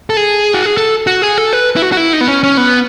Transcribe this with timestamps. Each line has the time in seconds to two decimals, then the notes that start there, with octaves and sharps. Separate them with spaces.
0.10 A4
0.17 G#4
0.54 F#4
0.65 G#4
0.77 A4
1.07 F#4
1.22 G#4
1.38 A4
1.53 B4
1.76 E4
1.82 F#4
1.92 F#4
1.97 E4
2.13 D#4
2.21 B3
2.28 C#4
2.44 C#4
2.57 B3